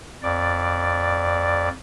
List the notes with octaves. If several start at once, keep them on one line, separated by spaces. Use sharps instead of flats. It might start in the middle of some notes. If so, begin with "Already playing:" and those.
F2 D5